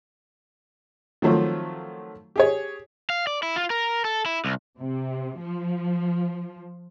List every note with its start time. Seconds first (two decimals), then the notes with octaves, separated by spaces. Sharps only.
1.22 D#3 F3 F#3 A3 C4 F4
2.36 G4 G#4 C#5
3.10 F5
3.27 D5
3.43 E4
3.56 F4
3.70 A#4
4.05 A4
4.26 E4
4.45 C2
4.80 C3
5.39 F3